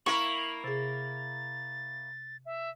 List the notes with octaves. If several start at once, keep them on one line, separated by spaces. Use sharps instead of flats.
A#3 E4 A#4 C#6 F#7
C3 G#4 A6
E5